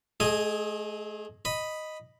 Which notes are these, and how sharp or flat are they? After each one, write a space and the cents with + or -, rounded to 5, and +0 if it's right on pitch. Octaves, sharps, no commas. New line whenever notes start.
A3 -40 G#4 +0 D#5 +0
D#5 +0 B5 +0